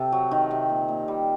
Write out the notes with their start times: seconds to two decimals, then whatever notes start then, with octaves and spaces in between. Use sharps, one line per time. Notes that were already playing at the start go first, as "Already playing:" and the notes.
Already playing: C3 A4
0.12 F#3
0.31 D#3
0.51 C3
0.69 A#2
0.88 A#2
1.08 G3